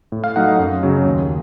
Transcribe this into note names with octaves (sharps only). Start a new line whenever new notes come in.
A2
F5
F#3 A3 D#4 F#5
D#5
F#2
C#3 F#3
D#2